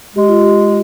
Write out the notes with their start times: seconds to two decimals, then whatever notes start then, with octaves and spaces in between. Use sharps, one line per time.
0.16 G#3 G4
0.28 F4
0.41 G4